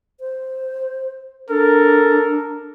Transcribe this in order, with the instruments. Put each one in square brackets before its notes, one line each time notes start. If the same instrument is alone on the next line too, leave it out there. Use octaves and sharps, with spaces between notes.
[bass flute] C5
[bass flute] D4 [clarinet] A4 [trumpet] A#4